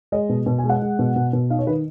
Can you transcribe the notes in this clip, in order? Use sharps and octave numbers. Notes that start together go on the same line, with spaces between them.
G#3 D#5
B2
B2
G#5
G#3
F#5
G#3
B2
B2
B2
D#4 F5
C#5
D#3 B4